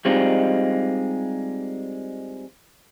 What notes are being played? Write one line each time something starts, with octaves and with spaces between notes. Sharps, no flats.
G3 G#3 C4 D#4 F4